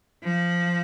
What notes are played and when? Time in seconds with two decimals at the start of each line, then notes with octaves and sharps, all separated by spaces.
0.24 F3